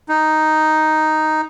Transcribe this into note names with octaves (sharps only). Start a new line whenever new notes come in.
D#4